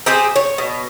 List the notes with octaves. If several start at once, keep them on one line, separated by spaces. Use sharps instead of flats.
C4 G4 G#4 C5
C#5
B2